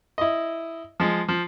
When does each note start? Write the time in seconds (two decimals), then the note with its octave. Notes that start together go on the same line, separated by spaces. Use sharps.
0.18 E4 D#5
1.00 F3 G#3
1.28 F3